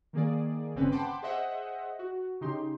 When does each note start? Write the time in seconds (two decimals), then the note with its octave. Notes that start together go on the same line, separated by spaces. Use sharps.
0.13 D#3 A#3 G#4 D5
0.75 G1 C#3 C4 C#4 B4
0.92 F#5 G5 A5 B5 C6 D6
1.22 G#4 C5 D#5 E5 F#5
1.99 F#4
2.41 C#3 D#4 G4 C6